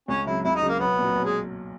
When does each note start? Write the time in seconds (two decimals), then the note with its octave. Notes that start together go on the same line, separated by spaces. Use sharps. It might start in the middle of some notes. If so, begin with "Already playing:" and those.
0.08 C#2 C#4
0.26 C#3 F#3 E4
0.44 C#2 E4
0.56 D#4
0.62 C#3 F#3
0.69 A#3
0.80 B1 B3
0.98 A#2 F#3
1.16 B1
1.25 G#3